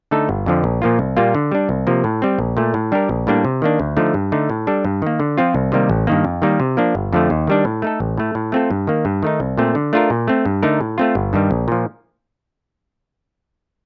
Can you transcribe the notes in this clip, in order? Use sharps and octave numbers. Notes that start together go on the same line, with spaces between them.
D3 A3 D#4 A4
G1
F2 D3 F3
A#1
A#2 F3 A#3 F4
C2
A#2 G3 A#3 F4
D3
G3 D4
C2
C3 F3 A#3
A2
G3 C4
A#1
A#2 A3
A2
G3 D4 G4 A#4
A#1
A2 G3 A#3 D4
C3
D#3 A#3 D4
D2
D3 F3 A3 D#4
G2
D3 A3 D#4
A2
G3 D4 A4
G2
D#3 A#3
D3
F3 C4 F4
C2
C3 D#3 G3 A#3
A1
G2 D#3 A#3
F2
D#3 G3 A#3 D#4
C3
F3 A#3 D4
G1
F2 D3 F3 A3
D#2
D#3 G3 D4
A2
A3 D#4 A4
A1
A2 A3
A2
A3 C4 F4 A4
G2
D#3 A#3
G2
D#3 A3 D#4
C2
A#2 A3 C4
D3
A3 D4 F4 A#4
A#2
A3 C4
G2
D3 A3 D#4 A#4
A2
A3 C4 F4
G1
G2 D#3 G3
A#1
A#2 F3